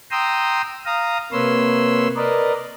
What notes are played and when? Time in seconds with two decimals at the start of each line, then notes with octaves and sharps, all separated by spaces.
0.11 G5 A#5 C6 D#6 E6
0.86 F5 A#5 D#6
1.32 C3 A#3 B4 C#5 C6 E6
2.16 A#4 B4 D5 D#5